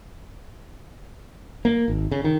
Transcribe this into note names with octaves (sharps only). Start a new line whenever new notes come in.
A#3
G#1
C#3
D#3